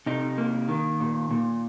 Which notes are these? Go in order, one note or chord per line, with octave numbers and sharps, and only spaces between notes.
C3 D#4
A#3
D#3
A#2
A#2